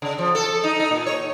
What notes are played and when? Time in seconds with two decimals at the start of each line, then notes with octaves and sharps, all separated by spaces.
0.02 C#3
0.18 F3
0.35 A4
0.63 D#4
0.80 D#4
0.91 A#2
1.06 C#5